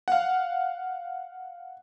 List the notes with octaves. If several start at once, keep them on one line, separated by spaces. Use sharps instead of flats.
F5 F#5